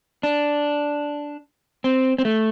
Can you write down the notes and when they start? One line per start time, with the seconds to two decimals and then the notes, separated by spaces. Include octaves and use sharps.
0.23 D4
1.84 C4
2.18 C4
2.25 A3